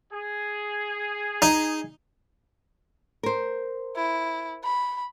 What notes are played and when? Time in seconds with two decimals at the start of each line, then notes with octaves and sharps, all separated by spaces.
0.12 G#4
1.42 D#4
3.23 A#4 C5
3.96 E4
4.63 B5